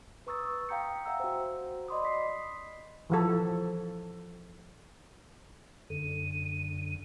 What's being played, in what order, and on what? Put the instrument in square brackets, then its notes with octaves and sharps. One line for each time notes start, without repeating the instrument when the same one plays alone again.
[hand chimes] B4 A#5 C#6 D#6 E6 A6
F5 G5 A#5 G6 C#7
E5 F#5 G5 A#5 E6
F#4 C5
D5 D#5 B5 C6 D6 D#6
B6 C7
[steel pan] E3 F3 A4
[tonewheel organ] F#2 D3 [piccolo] D#7